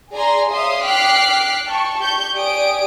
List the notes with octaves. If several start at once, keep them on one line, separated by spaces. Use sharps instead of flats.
G#4 D5 G#5 A#5 C6
C#5 E5 F5 C6 D#6
G5 D6 F6 F#6 B6 C7
G5 A5 C#6
G4 C#6 G6
G4 D5 G#5 D#6 D7